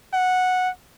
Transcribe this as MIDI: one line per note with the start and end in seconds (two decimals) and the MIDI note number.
0.14 0.69 78